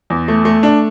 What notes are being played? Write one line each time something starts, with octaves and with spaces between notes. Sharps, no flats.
E2
A3
A3
D4